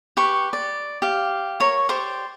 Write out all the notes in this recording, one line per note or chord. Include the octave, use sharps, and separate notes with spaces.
G4 B4 C#6
D5
G4 F5
A#4 C#5 C#6
G4 C5 D5 C#6